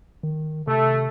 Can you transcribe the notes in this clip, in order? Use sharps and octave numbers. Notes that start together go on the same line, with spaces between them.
D#3
C3 A3